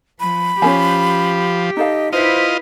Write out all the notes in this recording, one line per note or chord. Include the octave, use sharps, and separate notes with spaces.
F3 B5
F3 C#4 G4 G#4 G#5
D#4 A4 D#5 F5
E4 F4 B4 C5 D#5